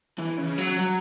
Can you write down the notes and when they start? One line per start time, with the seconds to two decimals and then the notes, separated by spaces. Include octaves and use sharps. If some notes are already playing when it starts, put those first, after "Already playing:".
0.18 E3
0.38 C#3
0.58 F#3
0.78 F#3